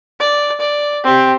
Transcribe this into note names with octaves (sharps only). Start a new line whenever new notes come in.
D5
D5
C4 G4